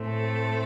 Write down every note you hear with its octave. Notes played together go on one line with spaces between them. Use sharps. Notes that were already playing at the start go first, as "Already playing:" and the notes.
Already playing: A2 A3 C4
A4